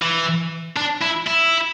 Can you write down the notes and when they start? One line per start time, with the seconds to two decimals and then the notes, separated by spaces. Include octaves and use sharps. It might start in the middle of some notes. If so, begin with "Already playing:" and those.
0.02 E3
0.77 D4
1.02 E4
1.27 E4